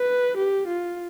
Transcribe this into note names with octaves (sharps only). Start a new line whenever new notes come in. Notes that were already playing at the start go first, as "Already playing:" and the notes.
Already playing: B4
G4
F4